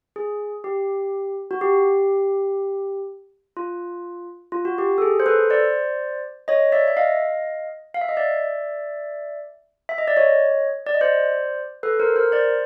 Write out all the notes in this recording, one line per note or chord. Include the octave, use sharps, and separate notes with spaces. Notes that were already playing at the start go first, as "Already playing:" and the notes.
G#4
G4
F#4
G4
F4
F4
F#4
G4
A4
G#4
C5
A4 B4
C5 D5
C#5 D#5
D5 E5
E5
D#5 F5
F5
E5
D#5
D5 E5
E5
D#5
D5
C#5 D#5
D5
D#5
C5 D5
A4 B4
A#4 C5
A#4 C5
C5 D5